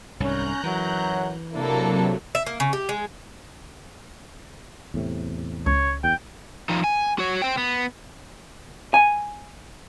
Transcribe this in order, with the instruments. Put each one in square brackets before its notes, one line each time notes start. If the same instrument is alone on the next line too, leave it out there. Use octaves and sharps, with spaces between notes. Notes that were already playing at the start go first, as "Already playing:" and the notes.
[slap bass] C2 G#2 [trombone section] C#4 [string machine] A#5 F#6 G6
[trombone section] F#2 F#3 [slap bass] E3
[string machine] C3 F#3 [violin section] A#3 A4 [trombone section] D4 E4
[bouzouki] E5
A#3
C#3
G4
G#3
[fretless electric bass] E2 A2 C3
[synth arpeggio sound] C#2 [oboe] C#5
[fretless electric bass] E2 [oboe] G5
[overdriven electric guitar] F3 D#4
G#5
F#4 C#5
C5 G5
B3
[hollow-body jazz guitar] G#5